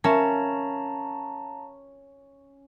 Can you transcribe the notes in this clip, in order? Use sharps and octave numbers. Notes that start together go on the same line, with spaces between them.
C#4 A#4 E5 F5 A5 A#5